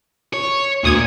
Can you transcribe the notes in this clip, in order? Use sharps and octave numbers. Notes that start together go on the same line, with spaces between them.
C#5
D2 A#2 D#6 G#6